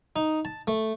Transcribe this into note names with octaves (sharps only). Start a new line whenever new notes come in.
D#4
A5
A3